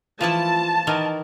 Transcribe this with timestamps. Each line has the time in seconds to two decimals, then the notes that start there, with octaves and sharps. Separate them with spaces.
0.21 E3 F3 E4 F4 A5
0.87 D#3 E3 D#4 A#4